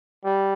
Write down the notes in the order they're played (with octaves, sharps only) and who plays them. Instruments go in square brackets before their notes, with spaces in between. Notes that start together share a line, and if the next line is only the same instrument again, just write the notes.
[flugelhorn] G3